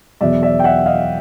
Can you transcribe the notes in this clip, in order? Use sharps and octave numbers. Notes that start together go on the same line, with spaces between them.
E2 B2 F#3 B3 D5 E5
D5 E5
G5
E5 F#5
D#5 F5